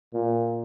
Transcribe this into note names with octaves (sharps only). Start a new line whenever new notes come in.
A#2